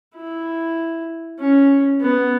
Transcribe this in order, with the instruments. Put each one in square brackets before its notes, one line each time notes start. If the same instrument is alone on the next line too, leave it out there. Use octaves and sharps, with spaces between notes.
[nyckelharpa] E4
C#4
B3